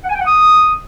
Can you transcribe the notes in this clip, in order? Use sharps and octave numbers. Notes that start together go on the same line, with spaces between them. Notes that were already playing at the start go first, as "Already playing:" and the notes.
F#5
G#5
G5
F#5
D#6